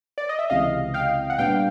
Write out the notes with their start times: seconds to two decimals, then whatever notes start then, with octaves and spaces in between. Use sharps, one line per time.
0.18 D5
0.29 D#5
0.39 E5
0.50 C#2 C3 E3 D#5 F5
0.94 F5 G5
1.30 F#5
1.38 A#2 G3 B3 D4 F5 G5